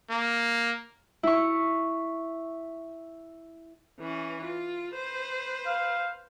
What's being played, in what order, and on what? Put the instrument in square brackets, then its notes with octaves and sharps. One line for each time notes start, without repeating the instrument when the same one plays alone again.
[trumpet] A#3
[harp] E4 C#6
[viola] E3 C#4
F4
B4 C5
[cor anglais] F5